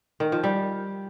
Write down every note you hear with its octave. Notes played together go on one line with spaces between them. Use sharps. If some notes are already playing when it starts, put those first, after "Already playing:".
D#3
F3
G3